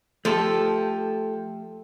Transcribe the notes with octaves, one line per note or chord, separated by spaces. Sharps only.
F3 A3 G4 A4